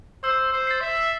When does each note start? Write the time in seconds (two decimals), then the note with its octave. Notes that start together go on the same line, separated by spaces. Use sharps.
0.23 C5 E6
0.53 C5
0.67 A6 C7
0.81 E5